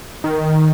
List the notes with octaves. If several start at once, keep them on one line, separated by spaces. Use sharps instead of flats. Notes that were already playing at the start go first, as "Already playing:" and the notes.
D#3